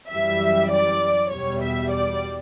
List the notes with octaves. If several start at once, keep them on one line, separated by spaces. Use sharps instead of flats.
F#2 E3 G3 E5
D5
E2 B2 G3 C#5
E5
D5